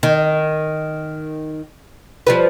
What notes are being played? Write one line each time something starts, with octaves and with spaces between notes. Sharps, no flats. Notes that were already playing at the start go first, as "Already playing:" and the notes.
D#3
F3 G3 B4